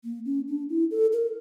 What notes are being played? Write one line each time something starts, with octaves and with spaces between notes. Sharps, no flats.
A#3
C#4
D4
E4
A4
A#4